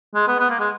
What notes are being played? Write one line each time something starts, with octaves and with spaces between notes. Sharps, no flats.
G#3
B3
B3
A#3
G#3